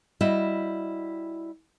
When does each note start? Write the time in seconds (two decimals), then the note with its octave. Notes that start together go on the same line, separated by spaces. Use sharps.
0.21 G3 E4 F#4 D#5 E5